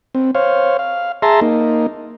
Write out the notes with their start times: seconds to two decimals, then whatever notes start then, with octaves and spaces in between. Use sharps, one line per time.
0.15 C4
0.35 C5 C#5 F5
0.79 F5
1.22 G#4 E5 A5 A#5 C6
1.41 A#3 D#4